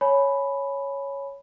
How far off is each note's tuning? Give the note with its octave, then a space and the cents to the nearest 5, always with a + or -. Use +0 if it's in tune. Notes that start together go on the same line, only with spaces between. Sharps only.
C#5 +0 G#5 +25 B5 +0